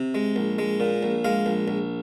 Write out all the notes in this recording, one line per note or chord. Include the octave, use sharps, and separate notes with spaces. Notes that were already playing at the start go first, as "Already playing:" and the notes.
Already playing: C3
G#3
A#1
G#3
A#2
A#1
G#3 F5
A#1
A#1